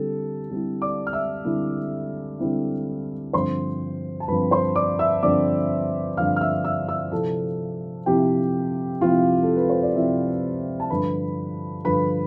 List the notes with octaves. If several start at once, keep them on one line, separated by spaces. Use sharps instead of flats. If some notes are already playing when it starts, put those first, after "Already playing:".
Already playing: D3 G3 C4 E4 A4
D3 G3 C4 E4
D5 D6
F6
E5 E6
D3 G3 C4 E4
D3 G3 C4 E4
G2 D3 F3 C4 C5 C6
A5
G2 D3 F3 C4 B4 B5
C5 C6
D5 D6
E5 E6
G2 D3 F3 C4 D5 D6
G2 D3 F3 C4 F5 F6
F6
E5 E6
E5 E6
E5 E6
C3 F3 C4 E4 A4 A5
C3 F3 C4 E4 G4 G5
C3 F3 C4 E4 F4 F5
A4
B4
C5
D5
C3 F3 C4 E4 E5
A5
G2 D3 F3 B4 B5
G2 D3 F3 B4 B5